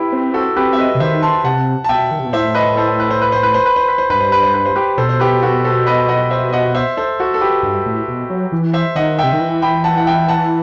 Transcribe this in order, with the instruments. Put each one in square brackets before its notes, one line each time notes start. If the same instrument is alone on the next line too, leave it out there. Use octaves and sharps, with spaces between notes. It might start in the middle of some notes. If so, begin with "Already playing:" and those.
Already playing: [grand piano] E4 G4 B4
[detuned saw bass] C4
[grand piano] F#4 A4
[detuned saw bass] C4 [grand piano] G4 B4
[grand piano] E5
B4 D#5
[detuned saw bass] C3
[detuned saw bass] D#3 [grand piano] C5 E5
[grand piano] A5 C6
[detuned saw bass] C3 [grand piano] F#5 A5
[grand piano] A5
[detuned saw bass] B2 [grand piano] E5 G5
[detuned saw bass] D#3
C3
B2
[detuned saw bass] A2 [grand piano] C5 E5
[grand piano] B4 D#5
A4 C5
B4
C5
B4
C5
B4
C5
B4
C5
B4
C5
[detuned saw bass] G2 [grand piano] B4
[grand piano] C5
B4
C5
B4
C5
G4 B4
[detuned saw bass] B2 [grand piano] A4 C5
[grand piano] C5
G4 B4
F#4 A4
A4 C5
B4 D#5
D#5 F#5
C5 E5
D#5 F#5
C5 E5
A4 C5
F#4 A4
A4
G4 B4
[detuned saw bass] G2
A2
B2
F#3
E3
[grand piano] C5 E5
[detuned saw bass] D#3 [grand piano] D#5 F#5
[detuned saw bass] C3 [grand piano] E5 G5
[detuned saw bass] D#3
E3
[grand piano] G5 B5
F#5 A5
F#5
E5 G5
F#5 A5